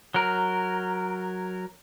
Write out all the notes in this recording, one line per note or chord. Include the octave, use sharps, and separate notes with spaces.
F#3 A#4